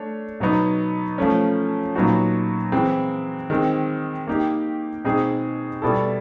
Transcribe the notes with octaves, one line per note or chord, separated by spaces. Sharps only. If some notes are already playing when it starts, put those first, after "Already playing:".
Already playing: A3 D4 C#5
B2 F#3 B3 D#4
F3 A3 C#4
A#2 F#3 B3 D#4 F#4
E3 G#3 C4
D#3 G#3 C4
A#3 D#4 G4
B2 G#3 C4 D#4 G#4
B2 G3 B3 E4 A4